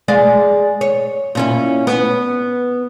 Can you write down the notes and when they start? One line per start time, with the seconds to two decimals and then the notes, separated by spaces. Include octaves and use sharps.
0.08 G#3 D5 F5
0.81 C#5
1.35 A#2 C#4 E4
1.87 B3